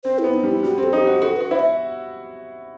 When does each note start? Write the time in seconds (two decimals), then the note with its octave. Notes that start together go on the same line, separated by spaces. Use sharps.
0.04 C4 C5
0.19 E4
0.24 B3
0.34 D#4
0.43 G3
0.49 E4
0.63 G3 F#4
0.78 C4
0.83 A4
0.93 D#4 G4
1.07 F#4
1.22 F#4 A4
1.36 F#4 B4
1.51 E4 C5
1.59 E5